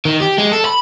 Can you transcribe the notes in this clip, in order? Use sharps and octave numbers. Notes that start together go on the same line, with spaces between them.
D#3
G4
G#3
A4
B5